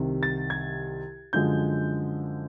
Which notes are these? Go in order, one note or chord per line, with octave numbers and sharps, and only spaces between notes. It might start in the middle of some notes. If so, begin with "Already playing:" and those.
Already playing: C2 C3 D#3
A6
G#6
F#2 D3 F3 G#3 G6